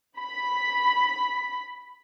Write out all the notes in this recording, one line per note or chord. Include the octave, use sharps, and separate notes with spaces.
B5 B6